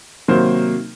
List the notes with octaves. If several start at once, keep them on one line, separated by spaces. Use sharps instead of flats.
C3 D#3 F#3 A#3 C5